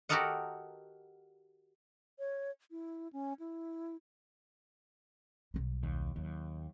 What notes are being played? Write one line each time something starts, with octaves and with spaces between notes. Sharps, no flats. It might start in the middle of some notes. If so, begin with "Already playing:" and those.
F#4 G4 A4 A#4 D#5 F#5
C#5
E4
C#4
E4
B1 G3
D#2
D#2 F#3